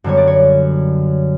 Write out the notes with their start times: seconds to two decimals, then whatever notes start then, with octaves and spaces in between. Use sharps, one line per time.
0.04 F#2 D3 G3 B3 C#5
0.17 D5
0.27 C#5